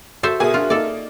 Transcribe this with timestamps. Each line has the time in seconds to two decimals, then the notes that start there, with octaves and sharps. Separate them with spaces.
0.23 F#4 A4 C5 E5
0.40 B2 G#4 A#4 E5 G#5 D6
0.54 D4 F4 F#4
0.70 A#3 D#4 A4 D5